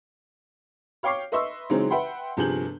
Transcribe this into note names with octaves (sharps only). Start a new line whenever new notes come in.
C#5 F5 G5 C#6 D6 C7
B4 D#5 E5 C6 C#6 E6
C#3 E3 F#3 G#3 C4 D#4
B4 E5 F#5 G5 B5 C6
G1 C3 F3 G#4 G6 F#7